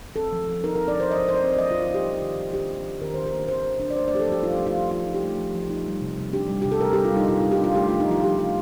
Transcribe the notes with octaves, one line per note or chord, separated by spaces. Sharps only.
C4 A4
F3
F3
D#4 A#4
A#4
C4
D5
F3 C5
F3 D#5
D#4 C5
D5
C4
D5
F3 D#5
F4
F3
F4
D#4 G4
A#3
D#3
D#3
D4 G4
A#3
D#3
D#3 A#4
D4 C5
A#4
A#3
D#3 C5
D#3
D4
D5
A3 C5
D5
F3 G4
A4
F3 G4
D#4 F4
A3
F4
F3
F3 F4
D#4
G4
A3
F3
F3
D#4
G3
C3
C3
D4 G4
G3
C3 G4
A4
C3 A#4
G4
D4
F4
G3 D#4
C3 F4
F4
C3
G4
D4 F4
A3 G4
F4
F3
D#4
F3 F4
D#4 G4
A3 F4